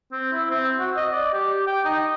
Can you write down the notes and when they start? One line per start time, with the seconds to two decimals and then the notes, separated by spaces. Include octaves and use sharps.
0.12 C4
0.32 E4
0.51 C4
0.79 F#4
0.97 D#5
1.12 D5
1.33 G4
1.67 G5
1.85 D#4